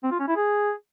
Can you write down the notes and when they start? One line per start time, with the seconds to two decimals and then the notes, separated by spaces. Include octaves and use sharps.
0.03 C4
0.11 F4
0.20 C#4
0.28 E4
0.36 G#4